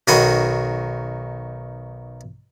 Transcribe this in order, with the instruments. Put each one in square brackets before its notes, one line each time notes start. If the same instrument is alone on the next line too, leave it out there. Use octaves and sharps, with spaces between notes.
[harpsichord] B1 D#3 F#4 G#5 B5 C6